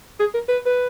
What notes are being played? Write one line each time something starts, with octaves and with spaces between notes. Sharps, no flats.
G#4
A#4
B4
B4